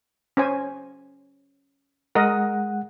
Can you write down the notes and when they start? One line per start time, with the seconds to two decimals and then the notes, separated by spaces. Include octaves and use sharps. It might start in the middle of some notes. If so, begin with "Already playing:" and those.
0.37 C#4 C5 G#5
2.15 G#3 A#4 D#5 F#5